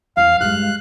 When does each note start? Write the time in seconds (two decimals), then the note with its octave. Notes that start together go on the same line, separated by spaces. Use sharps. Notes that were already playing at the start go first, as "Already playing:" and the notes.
0.17 E2 E3 F5
0.41 G2 G#3 F#6